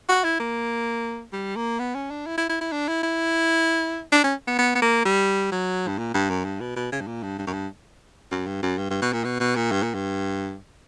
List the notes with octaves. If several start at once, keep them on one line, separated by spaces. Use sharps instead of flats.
F#4
E4
A#3
G3
A#3
B3
C#4
D4
E4
E4
E4
E4
D4
E4
E4
D4
C#4
B3
B3
B3
A#3
G3
F#3
G2
A#2
G2
F#2
G2
B2
B2
C#3
G2
A#2
G2
G2
F#2
G2
F#2
G2
F#2
G2
G2
B2
A#2
B2
B2
A#2
G2
A#2
G2